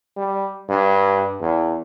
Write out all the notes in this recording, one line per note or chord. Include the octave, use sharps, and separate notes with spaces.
G3
G2
E2